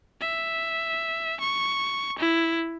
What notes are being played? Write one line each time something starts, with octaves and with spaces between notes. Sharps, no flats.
E5
C#6
E4